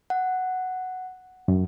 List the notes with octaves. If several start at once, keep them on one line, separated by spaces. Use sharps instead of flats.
F#5
F#2